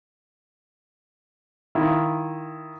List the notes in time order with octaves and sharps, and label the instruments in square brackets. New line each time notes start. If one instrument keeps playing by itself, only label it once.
[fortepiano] D#3 E4 F4